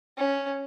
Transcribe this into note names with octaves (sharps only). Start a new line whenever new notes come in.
C#4